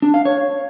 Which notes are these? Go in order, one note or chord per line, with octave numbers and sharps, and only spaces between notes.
D4
F5
C#5